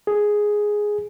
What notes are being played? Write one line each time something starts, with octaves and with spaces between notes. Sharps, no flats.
G#4